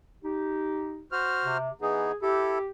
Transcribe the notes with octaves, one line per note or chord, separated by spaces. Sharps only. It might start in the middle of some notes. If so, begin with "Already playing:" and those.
D#4 G4
F#4 C5 F6
C3
E3 B3 D#4 G#4
E4 G4 A4